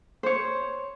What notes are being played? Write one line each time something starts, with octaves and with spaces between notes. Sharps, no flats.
C5 C#5